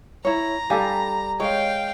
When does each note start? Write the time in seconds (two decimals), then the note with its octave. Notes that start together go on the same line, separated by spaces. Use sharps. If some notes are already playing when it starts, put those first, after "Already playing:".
0.25 E4 C#5 A#5
0.70 G3 D4 G4 A4 F5 G#5
1.40 G#3 C#5 F5 G5